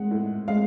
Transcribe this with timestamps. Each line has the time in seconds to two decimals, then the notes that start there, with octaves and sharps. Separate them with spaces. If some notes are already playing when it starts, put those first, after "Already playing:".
Already playing: G#3 F#5
0.11 A2
0.48 G#3 F5